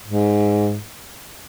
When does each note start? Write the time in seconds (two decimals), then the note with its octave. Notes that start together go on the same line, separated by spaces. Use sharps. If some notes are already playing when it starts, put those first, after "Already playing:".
0.07 G#2